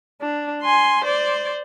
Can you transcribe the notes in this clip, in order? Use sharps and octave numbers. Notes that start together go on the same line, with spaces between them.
D4
G#5 C6
C5 D5